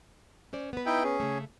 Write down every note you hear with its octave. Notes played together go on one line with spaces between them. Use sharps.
C#4 C5 D5
B3 B4
D#4 E4 G5
C#4 G#4
C#3 A3